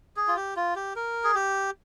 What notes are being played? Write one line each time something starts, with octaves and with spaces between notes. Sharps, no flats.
G#4
F4
G4
F4
G4
A#4
G#4
G4